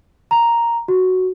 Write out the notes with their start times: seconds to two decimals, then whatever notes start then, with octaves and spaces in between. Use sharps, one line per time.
0.31 A#5
0.88 F#4